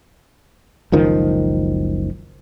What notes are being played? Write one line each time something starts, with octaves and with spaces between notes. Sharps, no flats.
F#1 C#2 D#3 F3